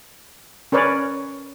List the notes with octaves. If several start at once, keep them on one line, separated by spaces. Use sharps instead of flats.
C#4 A#4 B4 C#5 D5